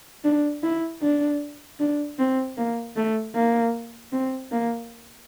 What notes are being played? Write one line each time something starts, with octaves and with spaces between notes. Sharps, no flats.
D4
E4
D4
D4
C4
A#3
A3
A#3
C4
A#3